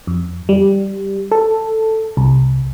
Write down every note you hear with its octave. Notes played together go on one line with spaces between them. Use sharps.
F2
G3
A4
C2